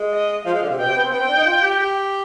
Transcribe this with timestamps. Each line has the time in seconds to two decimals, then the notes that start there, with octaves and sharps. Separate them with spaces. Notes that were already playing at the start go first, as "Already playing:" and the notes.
Already playing: G#3
0.13 D#5
0.45 F3 F5
0.54 G#3
0.63 D3
0.70 C3
0.78 B2 G5
0.86 C3
0.95 B3
1.04 C4
1.12 B3 G5
1.20 C4
1.28 D4
1.37 D#4
1.46 F4
1.62 G4
1.79 G4